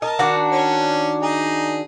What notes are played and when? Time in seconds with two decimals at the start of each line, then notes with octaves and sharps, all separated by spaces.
0.02 A#4 D#5 A5
0.19 D#3 D4 F#4
0.52 C#4
1.22 D#4 G#4